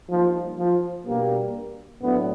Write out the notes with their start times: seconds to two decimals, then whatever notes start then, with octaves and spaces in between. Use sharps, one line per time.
0.10 F3 G3 A#3 D#4
0.58 F3
1.06 B2 G3 A#3 B3 D4 G4
2.02 A2 F#3 A3 B3 D4